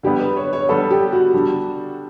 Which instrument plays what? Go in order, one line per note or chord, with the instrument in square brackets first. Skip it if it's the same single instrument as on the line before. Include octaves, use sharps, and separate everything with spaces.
[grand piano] D3 G3 B3 [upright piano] G4
[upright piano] B4
C#5
C#5
[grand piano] D3 G3 B3 [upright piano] A4
[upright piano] G4
F#4
[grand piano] D3 G3 D4 A4